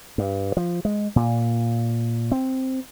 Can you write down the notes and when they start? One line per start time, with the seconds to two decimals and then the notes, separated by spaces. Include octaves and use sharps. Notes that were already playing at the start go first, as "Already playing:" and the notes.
0.18 G2
0.57 F3
0.85 G#3
1.16 A#2
2.32 C4